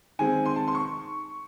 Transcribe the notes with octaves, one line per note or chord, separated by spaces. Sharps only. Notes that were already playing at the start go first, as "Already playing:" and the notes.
D#3 G#3 C4 G#5
C6
A5
C6
C#6